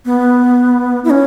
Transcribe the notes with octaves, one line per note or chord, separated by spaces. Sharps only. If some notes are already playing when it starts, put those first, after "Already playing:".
B3
E4
C#4